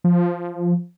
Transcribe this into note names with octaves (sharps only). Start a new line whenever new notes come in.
F3